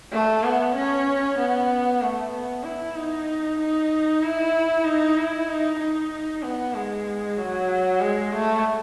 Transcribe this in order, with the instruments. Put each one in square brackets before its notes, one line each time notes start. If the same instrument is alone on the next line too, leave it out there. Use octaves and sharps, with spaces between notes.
[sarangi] A3
B3
C#4
B3
A3
B3
E4
D#4
D#4
E4
D#4
E4
D#4
D#4
B3
G#3
F#3
G#3
A3